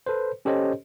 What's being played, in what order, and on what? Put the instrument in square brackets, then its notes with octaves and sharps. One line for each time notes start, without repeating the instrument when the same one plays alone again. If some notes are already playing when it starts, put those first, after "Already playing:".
[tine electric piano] A4 B4 C5
C#4 G4 A4 C5 C#5 D#5